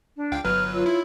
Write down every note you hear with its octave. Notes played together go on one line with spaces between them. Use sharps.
D4
C#2 F5 G5
G1 F#3 B4 F6
F4 C#5 E6
E4